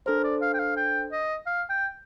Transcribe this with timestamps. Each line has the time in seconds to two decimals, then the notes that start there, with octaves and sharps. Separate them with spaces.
0.06 D4 A4 A#4 C5
0.24 D5
0.42 F5
0.54 G5
0.59 F5
0.77 G5
1.12 D#5
1.46 F5
1.70 G5